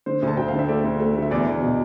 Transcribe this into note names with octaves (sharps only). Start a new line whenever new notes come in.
D3 C5
D2
A5
D2 G5
D3 F5
E5
A3 D5
D2
A3
D3
E5
E2 D5
E2
B2